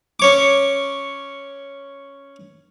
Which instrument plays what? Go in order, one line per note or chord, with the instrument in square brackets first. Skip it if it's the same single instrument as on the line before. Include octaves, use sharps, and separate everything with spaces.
[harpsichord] C#4 C#5 D6